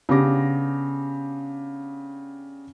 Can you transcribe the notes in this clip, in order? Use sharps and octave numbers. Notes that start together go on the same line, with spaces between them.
C#3 B3 D4 G4 D6 A#6